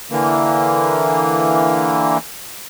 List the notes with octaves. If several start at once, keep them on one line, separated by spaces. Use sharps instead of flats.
D3 E3 A#3